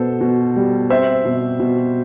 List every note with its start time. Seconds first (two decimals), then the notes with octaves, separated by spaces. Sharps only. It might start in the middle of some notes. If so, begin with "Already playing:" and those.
Already playing: B2 B3 A4 C5
0.21 B2
0.56 G3
0.90 C4 C5 E5
1.25 B2
1.60 B2